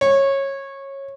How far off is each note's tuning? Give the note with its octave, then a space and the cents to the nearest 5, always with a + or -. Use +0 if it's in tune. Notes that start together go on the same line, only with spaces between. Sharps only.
C#5 -20